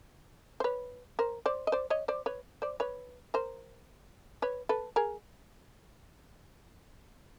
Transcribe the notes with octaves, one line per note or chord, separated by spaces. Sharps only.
C5
B4 C#5
A#4 C5
C5 D5
D#5
C5 D5
C#5 D#5
C5 D5
B4 C#5
C5 D5
B4 C#5
A#4 C5
B4 C#5
A4 B4
G#4 A#4